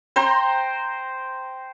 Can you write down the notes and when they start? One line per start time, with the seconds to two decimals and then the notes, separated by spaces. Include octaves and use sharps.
0.16 C5 G5 A#5 C6